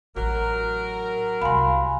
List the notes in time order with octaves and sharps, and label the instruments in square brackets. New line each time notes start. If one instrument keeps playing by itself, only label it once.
[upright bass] A1 [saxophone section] F#3 A#4
[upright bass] C2 G3 [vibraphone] F5 G#5 [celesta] B5 C6